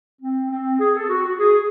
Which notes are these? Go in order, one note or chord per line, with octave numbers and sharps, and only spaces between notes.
C4
C4
G#4
A4
F#4
F#4
G#4